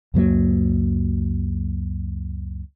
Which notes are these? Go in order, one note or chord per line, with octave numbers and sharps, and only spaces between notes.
C#2 F#2 F#3 A#3